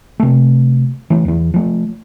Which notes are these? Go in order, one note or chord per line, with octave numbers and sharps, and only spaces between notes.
C3 A3
E3 A3
E2 E3
F3 A3